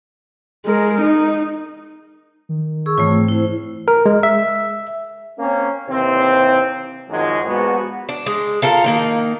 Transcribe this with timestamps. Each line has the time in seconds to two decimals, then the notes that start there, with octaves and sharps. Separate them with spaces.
0.66 G#3 A#4
1.02 D#4
2.49 D#3
2.86 G#4 C#6 E6
2.98 G#2 E3 A3 C4 F4 C#5
3.28 E4 C5
3.88 A#4
4.06 G#3
4.23 E5
5.39 A#3 C4 C#4
5.89 D#2 C3 E3 C4
7.10 F#2 D#3 F3 F#3 G#3
7.45 A#1 G#3 B3 F#4
8.09 D4
8.26 G#3
8.62 F4 A4 A#4 F5
8.84 D#3 A#3 D#4